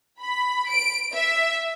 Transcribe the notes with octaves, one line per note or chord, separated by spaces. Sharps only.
B5
D7
E5